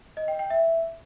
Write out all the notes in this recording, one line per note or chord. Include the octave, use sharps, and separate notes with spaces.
D#5
G5
G5
E5